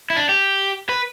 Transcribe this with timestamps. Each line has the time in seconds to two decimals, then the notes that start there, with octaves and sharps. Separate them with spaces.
0.10 E4
0.17 D4
0.29 G4
0.89 B4